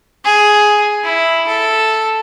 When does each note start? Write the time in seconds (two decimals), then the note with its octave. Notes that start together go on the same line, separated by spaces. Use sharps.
0.25 G#4
1.04 E4
1.47 A4